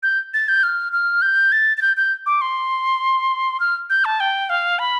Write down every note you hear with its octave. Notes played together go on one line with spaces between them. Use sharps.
G6
A6
G6
F6
F6
G6
A6
A6
G6
G6
D6
C6
F6
G6
A5
G5
F5
B5